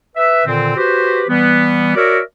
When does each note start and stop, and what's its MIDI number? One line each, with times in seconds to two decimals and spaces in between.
0.16 0.42 71
0.16 0.42 76
0.47 0.74 46
0.47 0.74 50
0.47 0.74 51
0.47 0.74 60
0.77 1.23 66
0.77 1.23 67
0.77 1.23 71
0.77 1.23 72
1.29 1.95 52
1.29 1.95 55
1.29 1.95 59
1.95 2.19 66
1.95 2.19 70
1.95 2.19 73
1.95 2.19 74
1.95 2.19 76